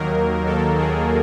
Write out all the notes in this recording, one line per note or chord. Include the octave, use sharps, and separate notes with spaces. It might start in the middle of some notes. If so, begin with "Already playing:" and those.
Already playing: D#2 D#3 F#3 A#3 A#4
A4
G#4